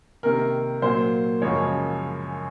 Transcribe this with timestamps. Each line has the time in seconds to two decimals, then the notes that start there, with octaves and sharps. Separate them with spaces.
0.23 C3 D#3 A#3 A#4
0.82 A#2 F#3 A#3 C5
1.42 F#2 C#3 F3 G#3 C#5